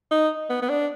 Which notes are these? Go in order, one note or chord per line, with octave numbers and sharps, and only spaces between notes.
D#4
B3
B3
D4